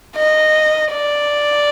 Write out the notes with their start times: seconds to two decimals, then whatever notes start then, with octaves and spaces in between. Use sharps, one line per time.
0.16 D#5
0.93 D5